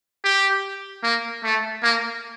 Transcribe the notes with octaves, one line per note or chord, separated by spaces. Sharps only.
G4
A#3
A3
A#3